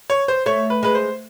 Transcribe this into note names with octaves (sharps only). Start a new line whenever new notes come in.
C#5
C5
A3 C#5
B4
G#3 B4
C5